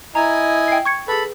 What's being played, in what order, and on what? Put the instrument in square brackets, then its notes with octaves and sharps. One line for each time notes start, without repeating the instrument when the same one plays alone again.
[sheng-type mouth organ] E4 D#5 G#5 [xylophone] A#5
[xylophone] G5 C7
C#6 G#6 C#7
[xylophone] G#4 B4 [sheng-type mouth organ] A4 B5